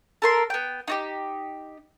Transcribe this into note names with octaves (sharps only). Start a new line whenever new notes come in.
A4 A#4 C6
B3 G5
D#4 F#4 G4